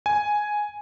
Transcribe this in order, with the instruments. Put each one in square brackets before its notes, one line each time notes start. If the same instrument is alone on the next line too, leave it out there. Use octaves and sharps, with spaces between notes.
[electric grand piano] G#5